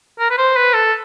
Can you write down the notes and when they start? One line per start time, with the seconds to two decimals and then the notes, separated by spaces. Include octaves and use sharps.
0.20 A#4
0.31 B4
0.38 C5
0.56 B4
0.74 A4